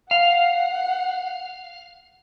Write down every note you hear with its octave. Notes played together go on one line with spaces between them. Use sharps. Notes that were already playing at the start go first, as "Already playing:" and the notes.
F5 F#5